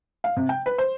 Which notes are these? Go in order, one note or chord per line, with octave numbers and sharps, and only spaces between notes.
F5
C3
G5
B4
C5